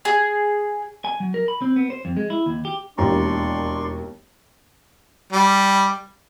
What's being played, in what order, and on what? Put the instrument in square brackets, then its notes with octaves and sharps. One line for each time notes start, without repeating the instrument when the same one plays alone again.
[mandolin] G#4
[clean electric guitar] G#5
F#3
A#4
B5
C4
B3
C5
F2
G#3
E4
D#2
G4
[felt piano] E1 D#2 A#5 [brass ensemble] D4 [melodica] D5 C6 C#6
[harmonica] G3